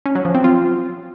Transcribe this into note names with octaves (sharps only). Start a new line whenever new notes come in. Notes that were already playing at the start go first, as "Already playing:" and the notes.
C#4
F#3
F3
C4
F4